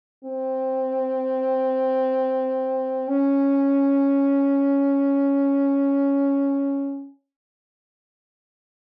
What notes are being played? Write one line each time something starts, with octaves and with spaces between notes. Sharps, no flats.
C4
C#4